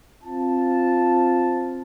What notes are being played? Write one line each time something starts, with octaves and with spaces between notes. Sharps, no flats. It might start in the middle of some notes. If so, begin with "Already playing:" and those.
C4 F4 A5